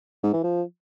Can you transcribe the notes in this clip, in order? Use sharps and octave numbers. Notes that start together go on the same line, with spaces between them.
G#2
E3
F3